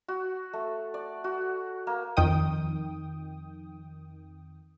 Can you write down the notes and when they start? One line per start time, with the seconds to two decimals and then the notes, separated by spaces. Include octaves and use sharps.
0.08 F#4
0.53 A3
0.94 D5
1.24 F#4
1.87 A#3
2.17 F2 D#3 G5 D#6